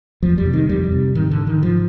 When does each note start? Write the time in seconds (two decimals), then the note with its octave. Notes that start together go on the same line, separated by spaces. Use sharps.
0.23 F2 F3
0.38 G3
0.45 C3
0.53 D#3
0.69 F2 G3
0.92 C3
1.15 G#2 D#3
1.31 D3
1.47 D#3
1.62 G#2 F3